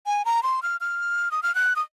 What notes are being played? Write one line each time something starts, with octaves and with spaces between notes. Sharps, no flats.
G#5
A#5
C6
F6
F6
D#6
F6
F#6
D#6